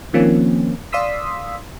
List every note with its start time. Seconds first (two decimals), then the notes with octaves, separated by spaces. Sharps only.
0.13 D#3 F3 A#3 C4 C#4
0.92 D5 F5 C6 D#6 E6 B6